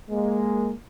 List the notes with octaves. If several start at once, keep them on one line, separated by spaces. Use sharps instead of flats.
G#3 A#3